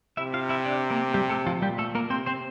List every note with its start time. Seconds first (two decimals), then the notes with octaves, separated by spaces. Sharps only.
0.17 C3 E4 E5
0.34 F4 F5
0.49 E4 E5
0.65 D4 D5
0.90 A#3 A#4
1.14 G3 G4
1.30 A3 A4
1.47 F3 F4
1.62 A#2 G3 G4
1.78 A3 A4
1.95 A#3 A#4
2.10 C3 C4 C5
2.26 C4 C5